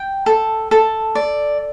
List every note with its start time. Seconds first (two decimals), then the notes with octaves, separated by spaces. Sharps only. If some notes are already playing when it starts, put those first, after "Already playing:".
Already playing: G5
0.26 A4
0.71 A4
1.15 D5